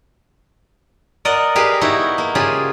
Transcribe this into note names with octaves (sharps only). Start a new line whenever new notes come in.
A#4 D5 D#5 F#5
G4 G#4 A#4 B4 F5
B3 D#4 E4 F#4
A#3
C#3 F4 G4 G#4